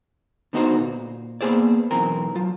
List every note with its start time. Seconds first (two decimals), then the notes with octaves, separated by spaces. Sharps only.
0.53 D3 B3 D#4 F#4 C5
0.79 A#2
1.41 A#3 B3 D4 G#4 C5 D5
1.91 B1 E3 C4 A#4 G#5
2.35 F#3 F4